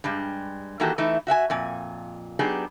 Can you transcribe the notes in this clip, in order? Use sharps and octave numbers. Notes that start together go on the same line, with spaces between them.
G2 G3 G#3
D#3 E3 A#3 F#4 G4 A4
E3 A3 D#4 E4
F#4 E5 F#5 G#5
F2 A#2 G#5
F#3 B3 D4 D#4 G4 G#4